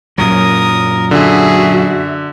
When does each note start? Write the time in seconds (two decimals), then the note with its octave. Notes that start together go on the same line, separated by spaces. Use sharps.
0.18 F#2 A#2 F#3 A#4 D#6
1.11 D3 F#4 G#4 E5